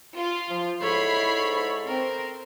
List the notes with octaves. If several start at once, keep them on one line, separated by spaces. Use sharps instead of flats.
F4
F3
G#2 E4 A4 C#5 B5 C7
C4 A#4